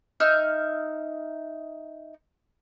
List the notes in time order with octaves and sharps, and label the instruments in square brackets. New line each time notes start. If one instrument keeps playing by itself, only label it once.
[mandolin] D#4 E5 F6